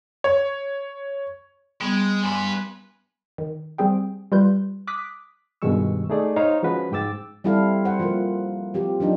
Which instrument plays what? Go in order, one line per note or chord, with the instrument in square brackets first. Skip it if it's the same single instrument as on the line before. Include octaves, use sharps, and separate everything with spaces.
[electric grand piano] C#5
[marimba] G3 B3 [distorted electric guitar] G#3
[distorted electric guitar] G2 B4 [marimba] G#5 C6
[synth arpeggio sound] D#3
G3 C4 G#4 G5
G3 F4 B4 G6
D6 D#6 F#6 B6
[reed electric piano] G2 B2 D#3 G#3 C#6 E6
A3 D#4 G#4 D5
D#4 C5 C#5 F5 A#5
F3 G#3 C#4 F#4 B4
G#2 G5 D6 E6 A6
[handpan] G3 C4 E4 A4 F5
C5 F#5
F3 A#3
F3 C4 G4
F3 F#3 D4 D#4